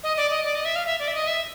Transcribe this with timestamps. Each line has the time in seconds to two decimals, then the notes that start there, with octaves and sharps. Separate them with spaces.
0.03 D#5
0.17 D5
0.31 D#5
0.45 D5
0.55 D#5
0.65 E5
0.76 F5
0.86 E5
1.00 D5
1.08 E5
1.14 D#5
1.27 E5